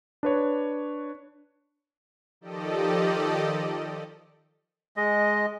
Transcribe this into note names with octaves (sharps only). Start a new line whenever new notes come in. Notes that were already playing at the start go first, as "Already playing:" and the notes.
D4 B4 C#5
D#3 F3 G4 A4 D5 D#5
G#3 D#5